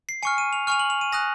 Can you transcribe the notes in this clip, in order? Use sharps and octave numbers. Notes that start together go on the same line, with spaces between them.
C7
G#5 C#6 F6 C#7
D#7
F7
G#5 C#6 F6 F7
F#7
F7
D#7
G#5 D#6 F#6 A#6